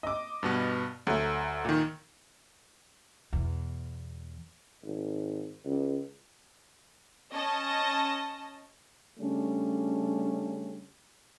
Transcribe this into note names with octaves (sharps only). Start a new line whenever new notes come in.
D#5 D6
G2 B2 B3
D2 F#3 A3
A#2 D#3
E2 B2
G#1
C#2
C#4 D#5 A5
C#3 G3 A3 C#4 D4